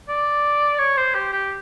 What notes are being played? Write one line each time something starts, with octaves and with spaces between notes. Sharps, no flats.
D5
C#5
C5
G4
G4